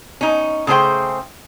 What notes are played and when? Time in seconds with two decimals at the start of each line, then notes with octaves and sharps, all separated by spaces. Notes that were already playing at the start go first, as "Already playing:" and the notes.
0.21 C#4 D#4
0.67 C#3 A3 G#4 C5 G5